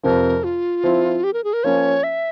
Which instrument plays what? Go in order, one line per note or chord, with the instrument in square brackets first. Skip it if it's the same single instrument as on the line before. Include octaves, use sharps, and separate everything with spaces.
[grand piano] F2 C3 F3 [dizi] A#4
[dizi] F4
[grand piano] F3 C4 E4
[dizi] G4
A#4
G#4
A#4
[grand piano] F3 A#3 C#4 [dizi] C#5
[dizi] E5